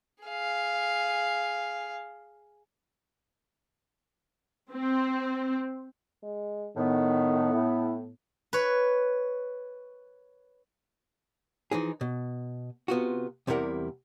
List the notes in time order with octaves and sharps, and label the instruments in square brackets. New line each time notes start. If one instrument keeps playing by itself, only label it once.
[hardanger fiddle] G#4 F5
[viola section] C4
[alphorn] G#3
[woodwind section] A2 B3 [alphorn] D#3
[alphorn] E4
[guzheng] B4 C#5
[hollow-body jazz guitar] E3 F3 D#4 G#4
B2
C3 B3 F4 F#4
E2 C3 G3 E4 A#4 F#5